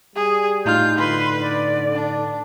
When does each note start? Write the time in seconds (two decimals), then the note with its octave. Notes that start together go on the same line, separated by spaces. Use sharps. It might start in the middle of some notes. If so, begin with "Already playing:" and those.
0.16 G3 G#4
0.66 A2 D#4 F4 F6 G6
0.98 D3 B4 C6
1.40 D5
1.95 D4